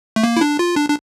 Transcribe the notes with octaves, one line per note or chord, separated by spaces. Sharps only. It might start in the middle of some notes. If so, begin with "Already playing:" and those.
A3
A#3
E4
D4
F4
D4
D4